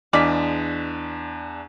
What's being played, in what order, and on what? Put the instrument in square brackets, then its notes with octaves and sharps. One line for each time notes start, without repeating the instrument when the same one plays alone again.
[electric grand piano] E2 D4 B6 [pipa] G#3 D5 F5